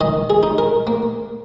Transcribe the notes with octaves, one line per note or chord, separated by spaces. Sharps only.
D#3 D#5
G#4
D#4
A#4
A#3